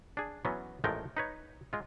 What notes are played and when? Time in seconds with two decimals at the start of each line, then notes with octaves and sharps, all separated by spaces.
0.17 D4 G#4
0.45 E3 F#3 B3 C#4
0.84 A1 F3 G#3 A3 A#4 G5
1.17 D#4 B4 C#5
1.73 G#3 F4